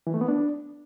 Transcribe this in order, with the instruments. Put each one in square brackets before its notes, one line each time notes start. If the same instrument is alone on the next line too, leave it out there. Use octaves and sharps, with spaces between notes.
[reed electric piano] E3
A3
B3
D4